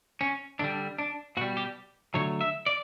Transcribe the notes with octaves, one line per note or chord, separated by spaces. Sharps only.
C#4
D3 G3 D4
D4
B2 G3 F#4
G4
D3 F#3 A3 C#5
E5
D5